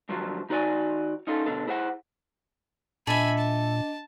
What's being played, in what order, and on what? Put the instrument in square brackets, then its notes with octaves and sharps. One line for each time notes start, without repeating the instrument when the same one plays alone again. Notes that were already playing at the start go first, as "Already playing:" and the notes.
[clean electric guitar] G2 D3 F3 F#3
D#3 D#4 F#4 A#4 D5 G#5
C#4 D#4 F4 A4
B2 D3 A4
E4 G#4 C5 D5 F#5
[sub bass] A#2 [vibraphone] D4 D#5 [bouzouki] A4 E5 [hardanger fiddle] G#5 B5
[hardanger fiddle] A5